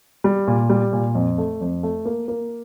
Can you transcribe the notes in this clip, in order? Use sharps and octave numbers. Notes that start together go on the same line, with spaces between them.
G3
A#2
G3
A#2
F2
A3
F2
A3
A#3
A#3